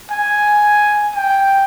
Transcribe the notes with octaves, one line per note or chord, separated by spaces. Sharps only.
G#5
G5